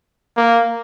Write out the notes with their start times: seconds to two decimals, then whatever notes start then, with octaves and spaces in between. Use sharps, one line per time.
0.37 A#3